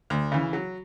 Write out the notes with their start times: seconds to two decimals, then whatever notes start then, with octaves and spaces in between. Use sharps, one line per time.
0.10 D2
0.32 C#3 E3
0.53 F#3